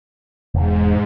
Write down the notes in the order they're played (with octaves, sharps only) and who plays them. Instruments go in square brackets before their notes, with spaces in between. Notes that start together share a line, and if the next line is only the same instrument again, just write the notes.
[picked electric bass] E1 [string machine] G#2